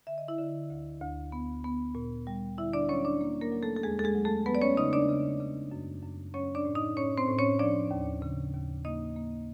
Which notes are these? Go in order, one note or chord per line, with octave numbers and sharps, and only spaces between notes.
D3 E5
D#5
E4 E5
D3
D2
D2
B3
B3
A#2
G3
D3 E4 E5
D4 D5
F#3 C#4 C#5
D4 D5
A#3
A#3 A#4
F#3
A3 A4
A4
E2 G#3 G#4
A4
G#3 G#4
F#3
A3 A4
F#3 B3 B4
D5
C#4 C#5
C#3 D#4 D#5
D4 D5
C#3
C#3
F#2
F#2
F#3 C#4 C#5
D4 D5
A2
D#4 D#5
A2 C#4 C#5
C4 C5
A2
C#4 C#5
F3 D4 D5
D#2
C#3
D#2
A#3 D#4 D#5
A#3